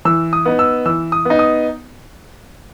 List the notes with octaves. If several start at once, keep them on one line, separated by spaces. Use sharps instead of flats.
E3 E6
D#6
B3 D#4
E6
E3 E6
D#6
B3 D#4
D#6